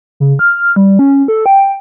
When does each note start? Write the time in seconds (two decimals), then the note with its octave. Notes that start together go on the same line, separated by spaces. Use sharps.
0.20 C#3
0.39 F6
0.76 G3
0.99 C#4
1.28 A4
1.46 G5